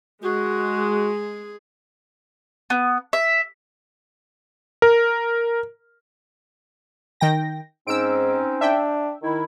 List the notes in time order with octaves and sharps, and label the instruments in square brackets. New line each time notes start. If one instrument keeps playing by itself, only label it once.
[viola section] G#3 [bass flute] F#4 [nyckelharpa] G#4
[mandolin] B3
E5
[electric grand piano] A#4
[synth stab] D#3 G5 A#6
[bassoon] G#2 [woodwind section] C4 C#4 D#4 [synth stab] E6 D7
[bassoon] D4 [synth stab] E5 G5
[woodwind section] D#3 E4